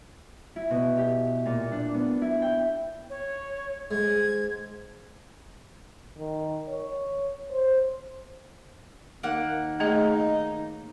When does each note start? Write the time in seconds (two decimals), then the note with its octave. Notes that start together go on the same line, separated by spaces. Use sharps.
0.56 E4
0.70 B2
0.98 G4
1.46 A#2
1.72 D4
1.94 B3
2.22 E4
2.42 G5
3.10 C#5
3.91 G#2 G#6
6.17 D#3
6.69 C#5
7.51 C5
9.23 D#2 A#3 F#5
9.80 A3 D#4 G#4 D#5